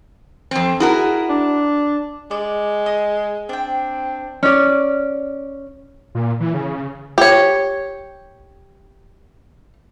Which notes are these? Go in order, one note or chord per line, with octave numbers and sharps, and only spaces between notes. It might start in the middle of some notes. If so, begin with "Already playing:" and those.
F2 C4
E4 F#4 G#4 A#4
D4
G#3 D5
D#5
C4 D4 G5
C#4 D5
A#2
E3
C#3
G4 C#5